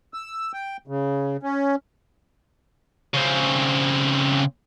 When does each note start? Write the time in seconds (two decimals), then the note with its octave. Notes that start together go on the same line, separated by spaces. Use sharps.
0.14 E6
0.53 G5
0.88 C#3
1.43 C#4
3.14 C#3 C4